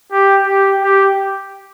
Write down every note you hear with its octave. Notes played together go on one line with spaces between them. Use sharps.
G4
G4
G4